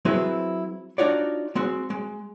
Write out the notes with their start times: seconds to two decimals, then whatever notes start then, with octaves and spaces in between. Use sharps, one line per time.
0.05 F#3 C4 E4 G#4 B4 C5
0.98 D4 D#4 F4 F#4 C#5 D5
1.55 G#3 C4 F#4
1.90 G#3